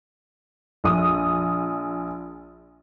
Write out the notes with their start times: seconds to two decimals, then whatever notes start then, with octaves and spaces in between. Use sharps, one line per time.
0.84 A#1 D#6